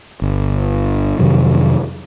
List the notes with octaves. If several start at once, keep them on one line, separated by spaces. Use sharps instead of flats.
G1
F2 C3 D#3 F#3